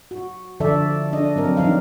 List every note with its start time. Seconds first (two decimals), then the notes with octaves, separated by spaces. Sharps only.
0.11 F#4
0.60 D3 F3 A4 D5 E5
1.13 D4 D#5
1.36 F#3 C4 A#4
1.57 E3 F3 C4 D4 D#4 F5